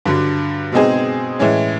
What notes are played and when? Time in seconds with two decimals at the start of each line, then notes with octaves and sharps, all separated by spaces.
0.05 G2 D3 F#3
0.72 B2 G#3 C4 D#4 G#4
1.39 A2 E3 G#3 C#4